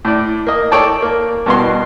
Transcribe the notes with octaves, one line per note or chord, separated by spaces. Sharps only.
A2 D5
A#3 D#5
A4 C#5 D5 G5 A5
A#3
G2 B2 C6